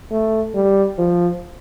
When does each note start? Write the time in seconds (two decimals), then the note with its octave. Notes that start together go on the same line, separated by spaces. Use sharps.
0.11 A3
0.54 G3
0.98 F3